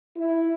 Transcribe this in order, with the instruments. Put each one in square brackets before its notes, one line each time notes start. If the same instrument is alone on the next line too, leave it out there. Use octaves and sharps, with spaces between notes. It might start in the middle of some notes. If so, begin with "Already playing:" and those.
[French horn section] E4